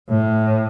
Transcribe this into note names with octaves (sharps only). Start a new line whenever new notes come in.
A2